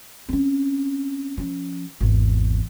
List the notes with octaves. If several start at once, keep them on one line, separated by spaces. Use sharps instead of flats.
C4 C#4
F3 C#4
G#1 E2